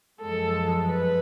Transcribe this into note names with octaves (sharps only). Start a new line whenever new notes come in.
F#2 F3 G#3 A4
B4